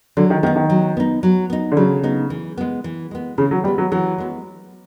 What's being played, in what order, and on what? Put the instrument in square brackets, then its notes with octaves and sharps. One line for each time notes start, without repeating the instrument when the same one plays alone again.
[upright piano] D3 [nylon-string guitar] F#3
[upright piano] D#3
[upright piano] D#3 [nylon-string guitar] B3
[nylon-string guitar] D#4
[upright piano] D#3
[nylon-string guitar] F#3
B3 D#4
F#3
B3 D#4
[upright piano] D3
[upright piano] C#3 [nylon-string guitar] F#3
[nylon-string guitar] B3 D#4
E3
G#3 B3
E3
G#3 B3
[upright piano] C#3 [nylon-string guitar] E3
[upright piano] F#3
[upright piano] G3 [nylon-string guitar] G#3 B3
[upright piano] F#3
[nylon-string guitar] E3 [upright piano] F#3
[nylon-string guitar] G#3 B3